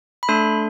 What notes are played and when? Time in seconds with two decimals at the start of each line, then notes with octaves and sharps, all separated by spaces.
0.23 B5
0.29 A3 D4 A4 C6